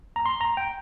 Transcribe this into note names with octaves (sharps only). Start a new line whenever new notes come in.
A#5
C6
A#5
G5